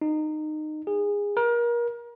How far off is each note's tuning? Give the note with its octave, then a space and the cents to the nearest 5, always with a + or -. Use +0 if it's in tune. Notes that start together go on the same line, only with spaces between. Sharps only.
D#4 -20
G#4 -20
A#4 +30